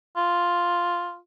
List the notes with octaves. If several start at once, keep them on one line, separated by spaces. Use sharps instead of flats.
F4